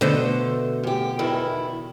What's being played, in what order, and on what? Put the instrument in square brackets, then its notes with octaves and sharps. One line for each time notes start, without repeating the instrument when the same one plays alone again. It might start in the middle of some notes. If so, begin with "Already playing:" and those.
[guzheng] B2 D3 [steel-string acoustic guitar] A3 C5
[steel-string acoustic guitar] F#2 G4
E2 D#3 E4